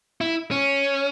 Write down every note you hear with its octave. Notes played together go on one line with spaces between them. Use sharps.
E4
C#4